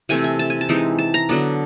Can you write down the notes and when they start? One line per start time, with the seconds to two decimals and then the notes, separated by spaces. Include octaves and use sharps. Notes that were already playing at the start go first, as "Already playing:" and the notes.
0.09 C3 E3 A3 C4 G#5
0.24 G#5
0.39 A5
0.50 G#5
0.61 A5
0.69 E3 G#3 C4 D#4
0.99 A5
1.14 A#5
1.29 D3 F#3 B3 D4